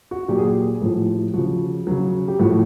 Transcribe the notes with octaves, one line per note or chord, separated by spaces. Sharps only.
F#4
A#2 F#3 G4
G#4
G4
A2 F3
C#3 F3 F#4
C#3 F#3
G4
A2 F3 F#4